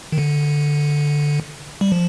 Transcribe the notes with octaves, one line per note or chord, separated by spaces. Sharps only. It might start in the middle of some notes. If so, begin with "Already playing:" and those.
D#3
D3
G3
F3